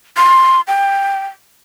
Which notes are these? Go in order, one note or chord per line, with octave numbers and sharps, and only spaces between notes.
C6
G5